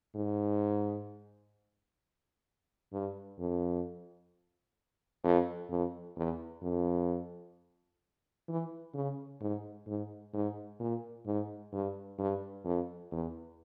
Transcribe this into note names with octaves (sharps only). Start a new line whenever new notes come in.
G#2
G2
F2
F2
F2
E2
F2
E3
C#3
G#2
G#2
G#2
A#2
G#2
G2
G2
F2
E2